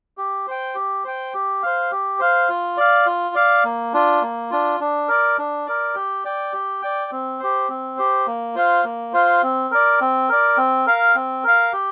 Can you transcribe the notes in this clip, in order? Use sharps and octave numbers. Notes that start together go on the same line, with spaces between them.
G4
C5 G5
G4
C5 G5
G4
C5 F5
G4
C5 F5
F4
D5 F5
F4
D5 F5
A#3
D4 F4
A#3
D4 F4
D4
A#4 D5
D4
A#4 D5
G4
D5 G5
G4
D5 G5
C4
G4 C5
C4
G4 C5
A#3
F4 C5 F5
A#3
F4 C5 F5
C4
A#4 D5
C4
A#4 D5
C4
A#4 F5
C4
A#4 F5
G4